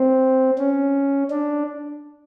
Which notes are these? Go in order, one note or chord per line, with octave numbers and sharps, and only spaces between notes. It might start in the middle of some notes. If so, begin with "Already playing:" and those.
Already playing: C4
C#4
D4